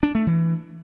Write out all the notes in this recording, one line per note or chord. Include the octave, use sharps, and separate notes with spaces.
D4
A3
E3